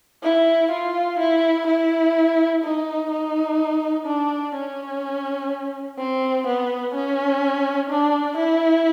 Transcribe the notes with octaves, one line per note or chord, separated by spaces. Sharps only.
E4
F4
E4
E4
D#4
D#4
D4
C#4
C4
B3
C#4
D4
E4